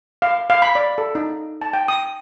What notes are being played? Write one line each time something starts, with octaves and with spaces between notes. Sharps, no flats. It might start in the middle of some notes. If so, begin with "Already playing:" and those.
F5
F5
B5
D5
A4
D#4
A5
G5
D#6